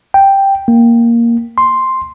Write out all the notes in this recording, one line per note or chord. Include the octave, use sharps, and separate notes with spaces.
G5
A#3
C6